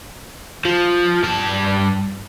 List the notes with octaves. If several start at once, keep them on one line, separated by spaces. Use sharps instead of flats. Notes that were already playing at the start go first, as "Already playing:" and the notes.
F3
G2 A5